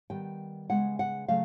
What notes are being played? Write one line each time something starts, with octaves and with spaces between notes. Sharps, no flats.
D#3 G3 B3 G5
C#3 E3 G#3 B3 F#5
F#5
C#3 F#3 A3 F5